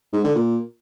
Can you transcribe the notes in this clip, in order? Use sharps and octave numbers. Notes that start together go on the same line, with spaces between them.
G#2
D3
A#2